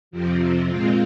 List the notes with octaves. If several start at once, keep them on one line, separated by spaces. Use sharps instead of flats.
F2 C3 F3 C4
A#2 G#3 C4 F4